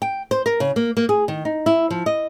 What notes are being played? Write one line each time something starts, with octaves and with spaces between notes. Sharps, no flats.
G5
C5
A#4
C#3
A#3
A#3
G#4
D#3
D#4
E4
F3
D#5